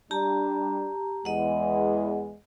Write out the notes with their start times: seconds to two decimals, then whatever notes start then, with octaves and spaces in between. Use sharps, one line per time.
0.11 G3 D4 G4 A5 A#5
1.25 E2 G#3 D#5 F#5